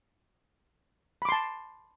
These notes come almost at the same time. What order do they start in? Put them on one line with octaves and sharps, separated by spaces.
B5 D6 C6 A5